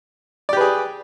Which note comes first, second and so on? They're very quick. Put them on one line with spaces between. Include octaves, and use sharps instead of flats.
D5 G4 B4 G#4